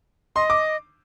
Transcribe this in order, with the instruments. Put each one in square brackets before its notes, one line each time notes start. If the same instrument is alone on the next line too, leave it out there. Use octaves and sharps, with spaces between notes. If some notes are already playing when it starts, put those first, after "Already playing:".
[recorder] D#5 [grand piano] C6
[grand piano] D6